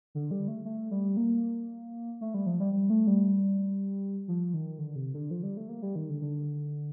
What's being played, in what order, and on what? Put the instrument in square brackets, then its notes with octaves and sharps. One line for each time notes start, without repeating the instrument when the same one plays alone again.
[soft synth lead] D3
G3
A3
A3
G3
A#3
A3
G3
F3
G3
G3
A3
G3
F3
D#3
D3
C3
D3
F3
G3
A3
A#3
G3
D#3
D3
D3